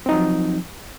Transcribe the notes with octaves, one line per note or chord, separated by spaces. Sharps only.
F3 F#3 C4 D#4